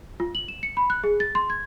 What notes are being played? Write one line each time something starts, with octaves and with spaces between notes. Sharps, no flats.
F4
F#7
E7
C#7
B5
F#6
G#4
A6
C6
G#6